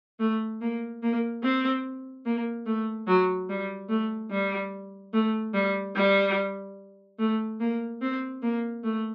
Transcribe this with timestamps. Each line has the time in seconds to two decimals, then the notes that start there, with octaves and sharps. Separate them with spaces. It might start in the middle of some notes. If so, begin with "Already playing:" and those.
0.19 A3
0.61 A#3
1.03 A#3
1.43 C4
2.26 A#3
2.66 A3
3.08 F#3
3.49 G3
3.89 A3
4.30 G3
5.13 A3
5.54 G3
5.96 G3
7.19 A3
7.60 A#3
8.02 C4
8.42 A#3
8.83 A3